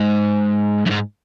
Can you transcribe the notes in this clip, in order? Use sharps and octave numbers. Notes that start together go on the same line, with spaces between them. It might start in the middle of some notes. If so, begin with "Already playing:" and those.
Already playing: G#2
F#2
G#2